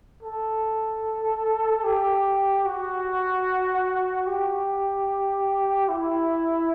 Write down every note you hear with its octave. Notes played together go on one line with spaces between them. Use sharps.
A4
G4
F#4
G4
E4